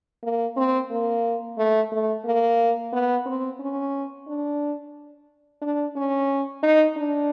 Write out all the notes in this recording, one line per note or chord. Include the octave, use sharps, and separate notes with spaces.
A#3
C4
A#3
A3
A3
A#3
B3
C4
C#4
D4
D4
C#4
D#4
D4